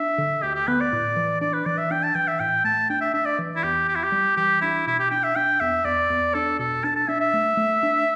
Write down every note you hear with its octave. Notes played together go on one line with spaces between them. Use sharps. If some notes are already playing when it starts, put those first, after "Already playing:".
Already playing: D4 E5
D3
D2 G4
G4
B3 B4
D5
A2
E3
D4 D5
B4
E3 D5
E5
D4 G5
A5
E3 G5
E5
A2 G5
A3 A5
D4 G5
E5
D4 E5
D5
E3
E4
E2 G4
E2 G4
E4
G4
G3
E3 G4
D4 E4
B2 E4
G4
D4 G5
E5
D4 G5
E2 E5
E2 D5
E2
D4 A4
B2 A4
D4 A5
A5
D4 E5
E5
A3
A3
D4